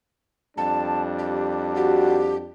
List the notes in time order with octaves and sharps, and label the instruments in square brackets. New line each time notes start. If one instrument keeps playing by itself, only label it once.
[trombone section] F2 G3 D4 [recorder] A5
[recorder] G4
[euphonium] F#4 [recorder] G4